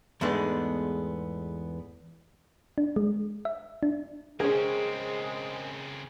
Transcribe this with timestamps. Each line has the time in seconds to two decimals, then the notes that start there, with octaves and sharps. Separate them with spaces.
0.21 E2 G#2 G#3 A3 B3 D4
2.78 D4
2.96 G#3
3.45 E5
3.83 D4
4.40 C#3 G#3 C4 C#4 G#4 A#4 C5